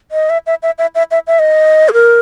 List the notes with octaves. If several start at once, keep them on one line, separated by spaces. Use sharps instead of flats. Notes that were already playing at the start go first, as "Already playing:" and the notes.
D#5
E5
E5
E5
E5
E5
E5
E5
D#5
G#4
A#4